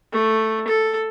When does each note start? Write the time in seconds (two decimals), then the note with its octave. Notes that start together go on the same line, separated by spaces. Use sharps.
0.12 A3
0.68 A4